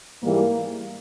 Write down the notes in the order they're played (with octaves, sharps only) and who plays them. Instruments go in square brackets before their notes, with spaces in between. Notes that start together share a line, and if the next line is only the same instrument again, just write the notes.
[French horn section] G#2 E3 G3 A#3